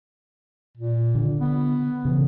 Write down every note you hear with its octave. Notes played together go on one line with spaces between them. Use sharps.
A#2
D3
B3
C#3 E3